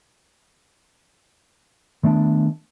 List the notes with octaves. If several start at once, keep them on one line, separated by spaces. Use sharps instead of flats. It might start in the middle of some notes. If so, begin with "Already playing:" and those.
D#3 A3 B3 D4